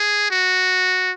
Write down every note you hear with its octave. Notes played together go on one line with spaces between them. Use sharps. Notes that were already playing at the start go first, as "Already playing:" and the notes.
Already playing: G#4
F#4